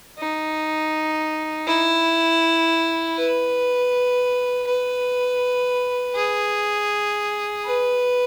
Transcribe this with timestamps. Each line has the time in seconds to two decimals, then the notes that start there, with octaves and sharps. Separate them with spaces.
0.18 D#4
1.67 E4
3.17 B4
4.67 B4
6.15 G#4
7.65 B4